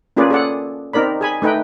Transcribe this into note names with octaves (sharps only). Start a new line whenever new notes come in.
A#3 C#4 F4 G#4 B4 D5
G#4 A4 D5 F#5
C4 D#4 A#4 D5 B5
G#4 G#5 B5
A3 D#4 B4 G5